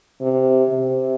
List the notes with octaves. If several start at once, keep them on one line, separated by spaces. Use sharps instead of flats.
C3
C3